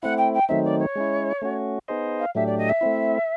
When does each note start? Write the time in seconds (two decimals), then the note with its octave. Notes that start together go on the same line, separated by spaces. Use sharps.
0.03 A3 C4 E4 F#5
0.18 G5
0.34 G5
0.48 D#3 F#3 A3 C4 D#4 E5
0.64 D5
0.79 C#5
0.95 G#3 C#4 E4
1.42 A3 C#4 F#4
1.88 B3 D#4 G#4 C5 D#5
2.19 F5
2.35 A2 F#3 A3 D4 G4 E5
2.47 D5
2.58 D#5
2.69 E5
2.81 A3 C4 E4